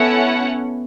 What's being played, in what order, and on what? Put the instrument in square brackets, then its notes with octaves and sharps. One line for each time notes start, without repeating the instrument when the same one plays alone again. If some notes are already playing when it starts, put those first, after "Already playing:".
Already playing: [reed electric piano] B3 [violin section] C#4 E4 A4 C#5 F#5